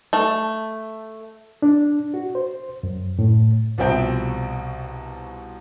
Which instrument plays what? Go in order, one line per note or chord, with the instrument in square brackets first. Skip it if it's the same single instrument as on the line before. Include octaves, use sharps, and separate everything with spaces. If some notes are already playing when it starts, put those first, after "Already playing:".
[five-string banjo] A3
[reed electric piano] D4
F#4
C5
F#2
A2
[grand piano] C2 B2 F3 C4 E5 G5